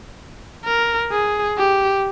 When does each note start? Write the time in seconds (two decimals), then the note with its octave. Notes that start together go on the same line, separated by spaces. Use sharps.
0.65 A#4
1.11 G#4
1.58 G4